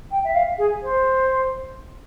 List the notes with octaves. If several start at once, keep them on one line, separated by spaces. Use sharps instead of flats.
G5
E5
F5
G#4
C5